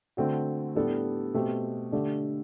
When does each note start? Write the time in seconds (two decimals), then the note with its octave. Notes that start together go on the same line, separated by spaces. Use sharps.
0.17 D3 A3 C4 F#4
0.75 A2 G3 B3 D4 A4
1.34 B2 A3 C4 G4
1.92 D3 A3 D4 G4